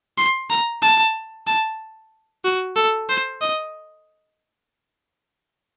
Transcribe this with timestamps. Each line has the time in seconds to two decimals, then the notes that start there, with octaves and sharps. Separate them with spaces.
0.18 C6
0.50 A#5
0.82 A5
1.47 A5
2.44 F#4
2.76 A4
3.09 C5
3.41 D#5